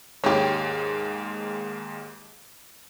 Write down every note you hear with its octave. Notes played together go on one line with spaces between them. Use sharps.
D#2 G#2 G#3 G4 C#5